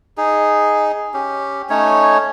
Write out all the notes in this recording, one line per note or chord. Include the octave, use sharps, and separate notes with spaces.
D#4 G#4
C#4 G4
A3 C#4 D#4 C#5